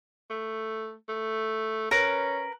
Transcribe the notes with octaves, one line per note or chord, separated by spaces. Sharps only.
A3
A3
C#4 A#4 B4